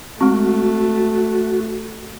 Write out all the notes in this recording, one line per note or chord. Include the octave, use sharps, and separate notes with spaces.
G#3 A3 C4 F#4